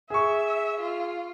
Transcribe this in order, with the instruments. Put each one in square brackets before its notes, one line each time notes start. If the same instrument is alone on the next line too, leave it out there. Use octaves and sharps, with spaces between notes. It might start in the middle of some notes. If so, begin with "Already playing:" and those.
[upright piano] G#4 C#6 [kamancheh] E5
[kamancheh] F4